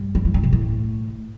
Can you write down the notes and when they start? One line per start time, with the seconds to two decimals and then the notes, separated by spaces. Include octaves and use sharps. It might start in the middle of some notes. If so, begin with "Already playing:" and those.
Already playing: G2
0.15 G3
0.25 E3
0.34 D3
0.43 C3
0.53 A2